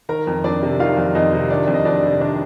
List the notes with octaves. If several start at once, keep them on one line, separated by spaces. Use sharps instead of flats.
D#3 A#4 A#5
F2
F2 D4 D5
C3
D#3 F4 F5
F2
F2 D#4 D#5
C3
D#3 D4 D5
F2
D#5
F2 D4 D5
C3
D#3 D4 D5